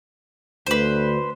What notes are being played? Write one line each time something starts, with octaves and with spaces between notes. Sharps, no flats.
D2 B4 C5